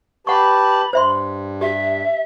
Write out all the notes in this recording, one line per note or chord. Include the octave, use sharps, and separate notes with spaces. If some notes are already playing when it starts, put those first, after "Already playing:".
G4 B4 F#5 A5 B5 C#6
G2 C5 E5 C6
G4 E5